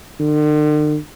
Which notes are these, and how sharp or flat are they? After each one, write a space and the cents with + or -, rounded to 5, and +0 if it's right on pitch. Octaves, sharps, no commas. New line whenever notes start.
D3 +45